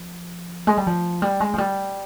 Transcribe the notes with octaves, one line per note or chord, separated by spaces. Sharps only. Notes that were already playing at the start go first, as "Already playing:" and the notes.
Already playing: F3
G#3
G3
F3
G3
G#3
F3
G3